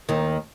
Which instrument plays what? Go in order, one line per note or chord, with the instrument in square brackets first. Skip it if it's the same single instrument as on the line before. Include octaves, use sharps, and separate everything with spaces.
[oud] D#2 D#3